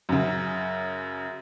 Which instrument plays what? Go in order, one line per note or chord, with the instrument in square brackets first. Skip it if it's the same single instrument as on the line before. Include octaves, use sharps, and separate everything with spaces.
[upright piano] F#2 C#3